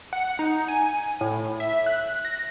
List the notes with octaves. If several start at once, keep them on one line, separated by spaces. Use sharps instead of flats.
F#5
D#4
G#5
A2
E5
F#6
A#6